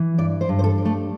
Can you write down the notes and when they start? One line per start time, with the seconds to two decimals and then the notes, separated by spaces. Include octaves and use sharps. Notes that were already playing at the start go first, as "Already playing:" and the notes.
Already playing: E3
0.18 G2 D5
0.41 C5
0.49 G2
0.59 C5
0.64 A4
0.78 G3
0.85 A3